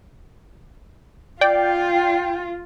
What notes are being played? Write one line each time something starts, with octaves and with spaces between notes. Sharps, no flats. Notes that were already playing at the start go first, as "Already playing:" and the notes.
F4 D5 G5